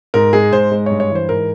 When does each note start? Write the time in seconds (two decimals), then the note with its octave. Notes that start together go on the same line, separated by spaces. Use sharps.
0.14 G#2 A#4
0.33 G#3 G#4
0.52 G#2 C5
0.72 G#3
0.86 G2 C#5
1.00 C#5
1.10 E3
1.15 C5
1.29 G#2 A#4